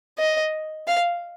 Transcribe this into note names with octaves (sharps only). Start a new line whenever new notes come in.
D#5
F5